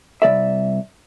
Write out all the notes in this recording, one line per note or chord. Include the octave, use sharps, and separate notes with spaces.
C2 E3 D5 E5